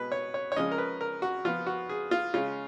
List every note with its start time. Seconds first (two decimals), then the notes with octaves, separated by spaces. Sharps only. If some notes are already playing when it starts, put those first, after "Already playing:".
Already playing: B2 G#3 B3 B4
0.12 C#5
0.34 C#5
0.52 C#5
0.56 C#3 F3 G#3 C#4 D#5
0.71 A#4
0.78 B4
1.01 A#4
1.22 F#4
1.45 F3 B3 F4
1.67 F#4
1.89 G#4
2.11 F4
2.34 C#3 G#3 C#4 F4